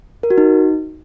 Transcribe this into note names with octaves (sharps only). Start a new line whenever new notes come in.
A#4
F#4
D#4